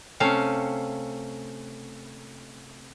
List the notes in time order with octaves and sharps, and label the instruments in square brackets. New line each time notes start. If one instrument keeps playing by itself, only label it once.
[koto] C3 A3 C#4 F5